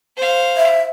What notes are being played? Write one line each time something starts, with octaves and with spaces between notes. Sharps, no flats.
C5 F5
E5